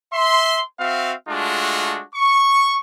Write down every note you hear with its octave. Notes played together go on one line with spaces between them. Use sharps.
E5 C6
C4 F#4 E5 F5
G#3 A3 D4 F4 F#4
C#6